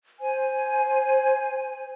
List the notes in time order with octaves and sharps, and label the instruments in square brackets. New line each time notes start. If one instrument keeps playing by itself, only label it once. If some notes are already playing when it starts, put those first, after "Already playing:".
[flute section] C5 G#5